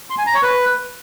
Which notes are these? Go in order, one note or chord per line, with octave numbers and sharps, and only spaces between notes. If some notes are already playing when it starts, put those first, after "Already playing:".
C6
G#5
A#5
C#5
B4